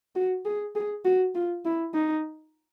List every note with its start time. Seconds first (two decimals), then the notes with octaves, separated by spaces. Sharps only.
0.15 F#4
0.45 G#4
0.75 G#4
1.05 F#4
1.35 F4
1.65 E4
1.94 D#4